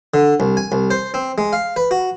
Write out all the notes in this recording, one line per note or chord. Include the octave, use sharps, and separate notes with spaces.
D3
C2
G#5
C2
C5
C4
G#3
F5
B4
F#4